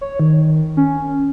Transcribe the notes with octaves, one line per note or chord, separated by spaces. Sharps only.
C#5
D#3
C#4